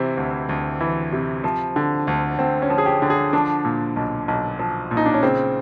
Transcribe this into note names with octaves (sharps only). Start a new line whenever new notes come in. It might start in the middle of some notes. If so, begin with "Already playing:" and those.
Already playing: C3 E3 C4
D2
D2
E3
C3
F3
D3
D2
D2 C4
C#4
F3
G#4
G4
D3
G#4
F3 D4
A#2
B1
B1
F3
A#2
D#4
D4
C#4
C#3 C4